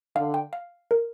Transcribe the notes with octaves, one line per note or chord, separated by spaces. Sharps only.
D3 F5
G5
F5
A#4